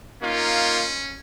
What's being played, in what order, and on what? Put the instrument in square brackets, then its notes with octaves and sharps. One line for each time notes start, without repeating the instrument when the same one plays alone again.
[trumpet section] A#3 D#4 F4 [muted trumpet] C#4